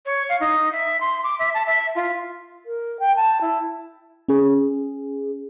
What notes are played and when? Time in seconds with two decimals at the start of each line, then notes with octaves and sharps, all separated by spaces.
0.05 C#5
0.29 F5
0.40 D#4
0.72 E5
1.00 C6
1.23 D6
1.38 E5
1.54 A5
1.66 E5
1.95 F4
2.66 A#4
3.00 G5
3.16 A5
3.41 E4
4.28 C#4 G#4